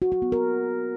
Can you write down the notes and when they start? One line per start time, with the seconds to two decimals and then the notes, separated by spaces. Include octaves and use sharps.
0.02 F#4
0.12 F#4
0.22 B3
0.32 A#4